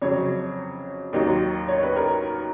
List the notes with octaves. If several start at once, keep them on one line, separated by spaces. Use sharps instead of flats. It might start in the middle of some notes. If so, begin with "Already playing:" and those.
F2 C#3 F#3 C#5
D#2 D#3 F#3
C#5
B4
A#4